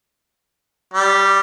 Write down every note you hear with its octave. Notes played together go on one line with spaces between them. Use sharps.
G3